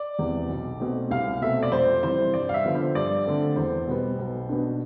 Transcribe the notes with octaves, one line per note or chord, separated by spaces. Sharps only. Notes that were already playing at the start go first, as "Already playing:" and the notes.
Already playing: D5
E2 C3
B1
B2 A3 C4
C2 F5
B2 A3 C4 E5
D5
F2 C5
C3 E3 G3 C5
G2 D5
F5
E5
D3 F3 B3
C5
G2 D5
D3 A3 C4
E2 C5
B2 G3 B3
B1
B2 B3 D4